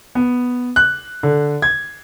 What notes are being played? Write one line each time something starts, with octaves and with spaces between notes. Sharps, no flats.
B3
F#6
D3
G#6